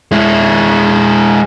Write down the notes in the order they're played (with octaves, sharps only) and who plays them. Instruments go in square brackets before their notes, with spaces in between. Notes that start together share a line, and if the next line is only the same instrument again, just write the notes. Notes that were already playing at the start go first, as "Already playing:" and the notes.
[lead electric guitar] G#3 E4